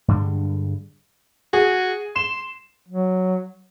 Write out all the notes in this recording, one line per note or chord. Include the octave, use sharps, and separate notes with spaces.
G2 D3 G3 G#3
F#4 G#4
C6 E7
F#3